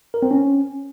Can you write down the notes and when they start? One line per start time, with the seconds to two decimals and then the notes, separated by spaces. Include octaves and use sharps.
0.14 A#4
0.22 C4
0.31 C#4